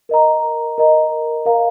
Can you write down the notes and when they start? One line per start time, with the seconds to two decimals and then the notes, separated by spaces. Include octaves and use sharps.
0.09 A#4 D#5 A#5
0.78 A#4 D#5 A#5
1.46 A#4 F5 A#5